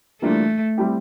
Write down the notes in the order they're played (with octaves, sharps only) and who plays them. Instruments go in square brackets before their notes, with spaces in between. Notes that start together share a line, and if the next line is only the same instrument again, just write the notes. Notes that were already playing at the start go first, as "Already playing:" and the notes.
[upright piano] E3 G3 A#3 D4 F4 [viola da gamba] A3
[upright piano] G3 C4 E4 G4